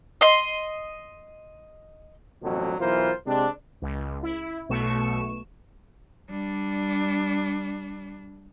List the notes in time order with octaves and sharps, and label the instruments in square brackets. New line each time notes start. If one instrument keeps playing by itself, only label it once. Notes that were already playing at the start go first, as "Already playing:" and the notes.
[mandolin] D#5 C6
[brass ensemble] A1 F2 B2 D3 F#3
B1 E3 F4 A#4 C5
C3 G#3 C4 D4
[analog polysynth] C#2
E4
B1 B2 A3 C#6 E7
[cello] G3 D4